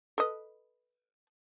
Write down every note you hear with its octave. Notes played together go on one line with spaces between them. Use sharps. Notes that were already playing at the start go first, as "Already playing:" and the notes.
A4 B4 D#5